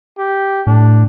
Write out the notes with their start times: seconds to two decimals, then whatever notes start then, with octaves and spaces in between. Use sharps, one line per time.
0.18 G4
0.67 A2 D4